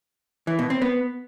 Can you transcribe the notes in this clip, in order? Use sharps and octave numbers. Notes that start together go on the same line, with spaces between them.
E3
B2
C4
B3